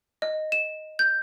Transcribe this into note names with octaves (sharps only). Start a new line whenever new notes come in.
D#5
E7
G6